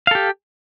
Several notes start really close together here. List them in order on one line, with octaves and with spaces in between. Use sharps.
F5 A4 G4